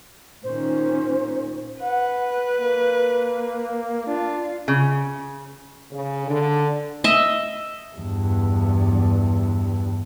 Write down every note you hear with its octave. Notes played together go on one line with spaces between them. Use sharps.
A#2 D#3 C#4 C5
B4 F#5
A#3
D4 F4
C#3
C#3
D3
D#5 E5
E2 G2